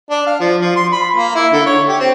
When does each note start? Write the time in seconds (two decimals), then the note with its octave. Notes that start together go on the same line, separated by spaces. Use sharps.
0.10 D4
0.26 F5
0.40 F3
0.60 F3
0.76 C6
0.92 B5
1.17 A#3
1.35 E4
1.52 D3
1.66 C#5
1.88 G4
2.00 C4